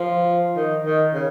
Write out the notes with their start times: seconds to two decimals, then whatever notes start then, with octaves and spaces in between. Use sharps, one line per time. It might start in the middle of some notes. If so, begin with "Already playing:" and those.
Already playing: F3
0.56 D#3
0.85 D#3
1.14 C#3